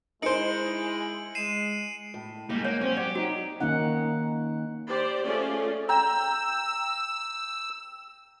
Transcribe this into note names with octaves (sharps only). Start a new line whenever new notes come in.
G#3 D#4 E4 C5 C#7 D7 F#7
G#3 C7 D#7 E7
A2
G3 G#3 A#3 D#4
A#3 C#5 F#5
F#3 C4 C#4
G4 D5 F#5
D#4 F#4
D#3 A#3 C#4 D#4 F#5
G4 C5 D5
A3 C#4 F4 G#4 D5
G5 A#5 E6